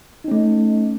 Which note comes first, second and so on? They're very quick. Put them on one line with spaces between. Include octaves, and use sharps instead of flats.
D#4 C#4 A3